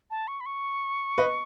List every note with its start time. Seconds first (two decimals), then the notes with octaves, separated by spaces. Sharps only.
0.11 A5
0.28 C#6
0.40 B5
0.46 C#6
1.18 B4 D#5